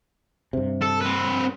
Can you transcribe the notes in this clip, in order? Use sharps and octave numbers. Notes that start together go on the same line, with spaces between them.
G2 C3
A4
C4 B4